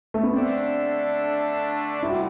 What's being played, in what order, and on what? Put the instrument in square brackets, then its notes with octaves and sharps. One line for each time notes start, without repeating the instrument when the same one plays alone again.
[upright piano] A3
B3
[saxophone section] D3 A3 D4 [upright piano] C4
[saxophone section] D2 C3 G3 [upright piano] E4
[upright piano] F#4